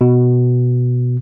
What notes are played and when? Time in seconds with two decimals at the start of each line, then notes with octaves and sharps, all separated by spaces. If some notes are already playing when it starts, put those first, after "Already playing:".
0.01 B2